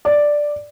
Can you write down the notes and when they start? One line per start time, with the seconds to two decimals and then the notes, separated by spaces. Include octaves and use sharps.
0.05 D5